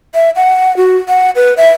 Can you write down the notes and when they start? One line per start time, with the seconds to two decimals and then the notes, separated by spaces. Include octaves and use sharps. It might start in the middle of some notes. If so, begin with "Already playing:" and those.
0.15 E5
0.36 F#5
0.77 F#4
1.09 F#5
1.36 B4
1.57 E5